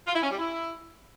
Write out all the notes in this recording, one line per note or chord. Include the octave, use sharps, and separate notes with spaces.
F4
E4
C#4
G3
E4